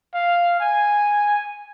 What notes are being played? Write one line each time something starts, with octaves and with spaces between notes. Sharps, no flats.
F5
G#5